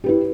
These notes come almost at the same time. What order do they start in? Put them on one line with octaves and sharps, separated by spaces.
G4 B4 E4